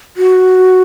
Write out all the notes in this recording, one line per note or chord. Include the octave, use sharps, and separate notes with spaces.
F#4